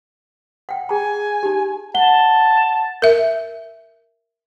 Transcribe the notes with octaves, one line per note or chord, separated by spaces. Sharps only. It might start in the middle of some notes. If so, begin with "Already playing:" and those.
F#5 G5
G#4 G#5 A#5
D#4 G4
F#5 A5 G7
A#4 E5